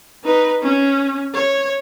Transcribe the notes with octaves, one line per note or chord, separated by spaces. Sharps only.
D#4 B4
C#4
C#5